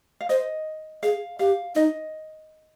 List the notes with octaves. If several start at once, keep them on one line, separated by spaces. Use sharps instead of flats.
F5
C5 D#5
G#4 F5
G4 F5
D#4 D#5